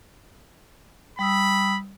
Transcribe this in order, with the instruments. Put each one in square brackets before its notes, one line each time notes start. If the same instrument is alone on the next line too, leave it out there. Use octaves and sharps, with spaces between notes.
[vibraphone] G3 D#6 E6 [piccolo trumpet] B5